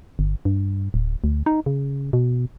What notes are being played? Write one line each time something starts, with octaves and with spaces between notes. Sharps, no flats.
G1
G2
D1
D2
D#4
C#3
B2